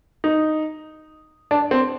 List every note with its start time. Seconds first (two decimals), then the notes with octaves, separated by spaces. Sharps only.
0.24 D#4
1.51 D4
1.71 C4